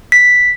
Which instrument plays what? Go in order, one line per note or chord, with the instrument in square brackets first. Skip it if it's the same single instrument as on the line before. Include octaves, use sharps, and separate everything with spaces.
[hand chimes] B6